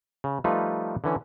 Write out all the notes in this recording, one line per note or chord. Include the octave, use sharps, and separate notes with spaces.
C#3
F3 G3 A3 D#4 F4 B4
D3 E3 C#4